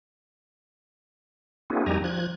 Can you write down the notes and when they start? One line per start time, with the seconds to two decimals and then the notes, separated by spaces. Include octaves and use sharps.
1.70 A#3 C4 D4 E4 F#4 G#4
1.86 F2 G3 D#4 G4 G#5 A#5
2.04 F3 F#6 G#6